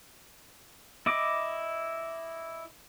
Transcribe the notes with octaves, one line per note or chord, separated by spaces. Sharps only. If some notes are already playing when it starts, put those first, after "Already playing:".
E4 D#5 D6